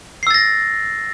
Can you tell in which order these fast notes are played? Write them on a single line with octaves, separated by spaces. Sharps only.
C7 E6 A6 A#6